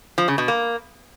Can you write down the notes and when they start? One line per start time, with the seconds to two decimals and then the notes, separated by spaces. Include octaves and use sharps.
0.18 F3
0.28 C#3
0.38 B2
0.48 A#3